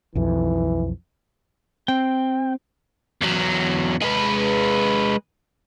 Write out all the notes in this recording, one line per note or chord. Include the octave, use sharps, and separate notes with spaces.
B1 F2 E3
C4 G5
E2 F#3
G#3 B4